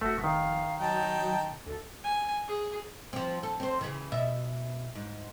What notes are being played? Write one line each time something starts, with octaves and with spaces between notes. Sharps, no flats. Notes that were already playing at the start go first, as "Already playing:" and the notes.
F1 A3 F#4 E5
D#3 F5
F#3 D#4 G5 A5
D2 A4
G#5
G#4
F3 C4
A4
C4 C5
C#3 E3
B2 E5
G#2